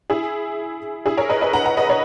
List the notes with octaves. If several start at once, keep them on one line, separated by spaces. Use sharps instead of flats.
E4 G#4
E4 G#4
A#4 C#5
B4 D#5
B4 D#5
F#5 A#5
F#5 A#5
B4 D#5
C#5